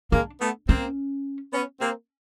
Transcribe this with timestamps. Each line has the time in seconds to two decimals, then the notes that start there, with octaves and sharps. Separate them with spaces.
0.12 G#3 A#3 D4
0.41 A3 B3
0.68 A#3 C4 C#4
1.53 B3 C#4
1.81 A#3 C4